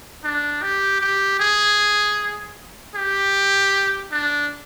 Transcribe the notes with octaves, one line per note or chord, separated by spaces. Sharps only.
D4
G4
G4
G#4
G4
D4